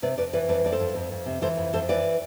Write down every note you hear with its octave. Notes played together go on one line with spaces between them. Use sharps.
C3 B4 D5
F2 B4 D5
E3 B4 D5
F2 B4 D5
F2 D5
A4 C5
F2
F2
F2
C3
E3 A4 C5
F2
F2 A4 C5
E3 B4 D5